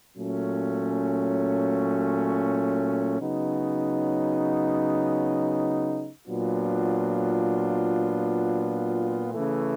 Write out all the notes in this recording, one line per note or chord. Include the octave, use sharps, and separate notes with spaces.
A#2 F#3 A3 C#4
C#3 F#3 B3 D#4
A#2 F#3 B3 D4 F4
C#3 E3 A3